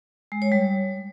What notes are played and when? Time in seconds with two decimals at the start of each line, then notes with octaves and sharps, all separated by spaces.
0.32 G#3
0.42 C#5
0.52 G3